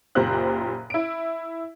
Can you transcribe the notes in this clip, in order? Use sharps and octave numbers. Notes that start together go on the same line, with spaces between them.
F#1 A#2 G4 C5 F#6
E4 D7